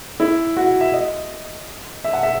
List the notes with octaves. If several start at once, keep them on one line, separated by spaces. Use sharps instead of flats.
E4
F#4
E5
D#5
E5
F#5
E5